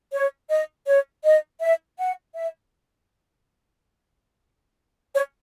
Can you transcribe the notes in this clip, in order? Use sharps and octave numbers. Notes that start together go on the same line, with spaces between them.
C#5
D#5
C#5
D#5
E5
F#5
E5
C#5